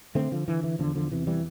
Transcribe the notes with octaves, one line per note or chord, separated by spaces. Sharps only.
D3 A3 C4
D3 F3
D3 E3
E3
E2 D3 F3
D3 F3
C3 E3
E3 G3